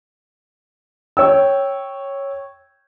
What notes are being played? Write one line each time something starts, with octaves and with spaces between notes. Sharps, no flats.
C#5 G5 E6